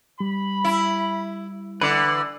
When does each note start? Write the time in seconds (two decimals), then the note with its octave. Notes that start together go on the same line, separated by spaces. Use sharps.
0.20 G3 B5
0.64 E4
1.81 D3 E3 B4 D5 F#5